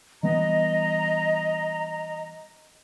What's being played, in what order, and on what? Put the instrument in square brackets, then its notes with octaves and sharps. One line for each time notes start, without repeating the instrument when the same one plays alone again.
[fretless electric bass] E3 G3 B3 [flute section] D#5 A#5